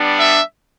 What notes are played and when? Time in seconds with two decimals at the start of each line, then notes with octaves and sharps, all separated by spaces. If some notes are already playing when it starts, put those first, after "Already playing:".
Already playing: G3 B3 D4
0.18 E5